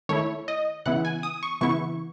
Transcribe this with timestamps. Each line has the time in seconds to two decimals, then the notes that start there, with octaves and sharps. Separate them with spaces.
0.09 D#3 A3 E4 C#5
0.48 D#5
0.86 C#3 E3 B3 E4 F#5
1.05 G#5
1.23 D#6
1.43 C#6
1.61 C#3 E3 B3 E4 C#6